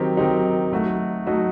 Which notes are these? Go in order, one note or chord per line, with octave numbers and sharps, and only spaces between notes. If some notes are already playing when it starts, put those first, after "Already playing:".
Already playing: D#3 F#3 C4 D#4 G4
D#3 F#3 C4 D#4 G4
F#3 A3 D#4 F#4
F#3 A3 D#4 F#4